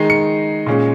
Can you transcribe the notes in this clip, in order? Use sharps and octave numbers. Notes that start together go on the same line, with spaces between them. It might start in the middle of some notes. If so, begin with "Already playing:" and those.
Already playing: D#3 G#3 D#4 C7
C#7
A#2 G#3 C#4